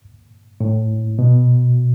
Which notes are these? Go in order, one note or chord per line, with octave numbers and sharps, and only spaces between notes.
A2
B2